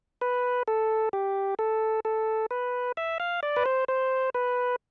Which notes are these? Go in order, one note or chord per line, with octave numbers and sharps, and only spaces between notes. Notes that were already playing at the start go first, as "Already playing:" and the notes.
B4
A4
G4
A4
A4
B4
E5
F5
D5
B4
C5
C5
B4